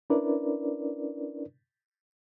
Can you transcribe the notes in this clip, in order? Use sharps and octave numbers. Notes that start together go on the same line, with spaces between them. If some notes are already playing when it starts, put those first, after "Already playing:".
C#4 D4 E4 A#4 B4 D5